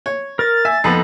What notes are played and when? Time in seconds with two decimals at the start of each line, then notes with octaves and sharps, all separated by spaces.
0.06 C#5
0.39 A#4 A6
0.65 E5 G#5
0.84 F2 B3 D#4 A4 B5